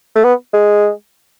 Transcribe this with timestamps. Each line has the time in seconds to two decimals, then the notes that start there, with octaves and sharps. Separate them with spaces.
0.15 A3
0.24 B3
0.53 G#3